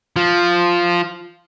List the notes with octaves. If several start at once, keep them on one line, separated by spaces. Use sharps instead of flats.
F3